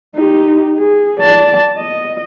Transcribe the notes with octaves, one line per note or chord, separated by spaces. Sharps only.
D#4 G4
G#4
D5 A5
D#5